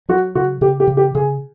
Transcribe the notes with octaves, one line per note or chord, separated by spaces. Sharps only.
F#3 F#4
C#3 F#4
C#3 G4
G4
C#3
G4
C#3 G#4